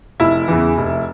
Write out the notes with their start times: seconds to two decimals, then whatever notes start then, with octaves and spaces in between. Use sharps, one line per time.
0.20 F1 E4
0.48 E2 C#3 E3
0.78 F1